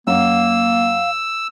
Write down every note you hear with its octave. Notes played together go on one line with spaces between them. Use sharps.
F#2 A#3 F5 E6